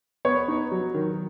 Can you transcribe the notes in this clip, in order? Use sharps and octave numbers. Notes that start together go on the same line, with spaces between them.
B3 C#5
D#4
F#3
D#3